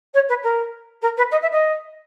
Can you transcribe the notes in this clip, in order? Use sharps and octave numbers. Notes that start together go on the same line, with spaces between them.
C#5
B4
A#4
A#4
B4
D#5
E5
D#5